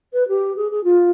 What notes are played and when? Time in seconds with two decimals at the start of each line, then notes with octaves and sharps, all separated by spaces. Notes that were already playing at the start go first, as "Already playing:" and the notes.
0.13 B4
0.28 G4
0.56 G#4
0.71 G#4
0.84 F4